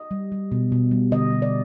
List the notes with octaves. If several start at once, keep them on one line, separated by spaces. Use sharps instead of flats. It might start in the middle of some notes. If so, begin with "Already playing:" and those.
Already playing: D#5
G3
G3
B2
B2
G3
D3 D#5
G3
D5